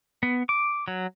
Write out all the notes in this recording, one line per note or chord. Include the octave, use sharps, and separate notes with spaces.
B3
D6
F#3